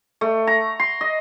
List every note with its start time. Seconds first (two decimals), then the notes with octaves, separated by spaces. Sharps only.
0.21 A3
0.47 A#5
0.80 C6
1.01 D#5